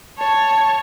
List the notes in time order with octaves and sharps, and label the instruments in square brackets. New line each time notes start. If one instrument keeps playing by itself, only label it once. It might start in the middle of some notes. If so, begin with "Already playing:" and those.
[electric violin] C#5 [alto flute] A5